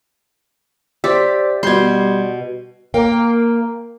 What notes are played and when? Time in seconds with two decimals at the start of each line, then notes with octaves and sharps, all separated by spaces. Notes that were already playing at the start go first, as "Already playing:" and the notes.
1.04 G4 C5 D5 E5
1.63 B2 G3 C6 G6 G#6
2.94 A#3 A#4 F5 G5